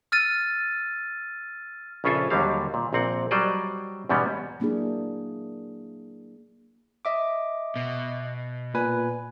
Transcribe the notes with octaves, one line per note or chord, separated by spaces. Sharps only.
E6 F6 A6 D#7
A#1 C#3 C#4 F4 A4 E5
D#2 D3 F#3 G3 F5
A#2
A#1 A#2 C4 F#5
F#3 G3 C5 D5 D#5
E2 G#2 B2 G3 B3 C#4
F#3 A#3 D4 E4 G#4
D#5 E5 D6
B2
A#2 B4 G#5